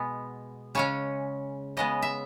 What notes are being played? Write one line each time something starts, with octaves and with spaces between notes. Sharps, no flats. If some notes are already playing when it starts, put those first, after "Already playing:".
Already playing: B2 G#3 B3
C#3 G#3 C#4 C#5
C#3 G#3 B3 D#5
E5